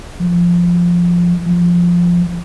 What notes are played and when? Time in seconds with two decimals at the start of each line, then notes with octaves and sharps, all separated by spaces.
0.20 F3
1.46 F3